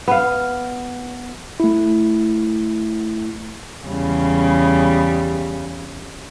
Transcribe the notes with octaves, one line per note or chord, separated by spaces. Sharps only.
B3 F5
A3 E4
E2 C#3 G3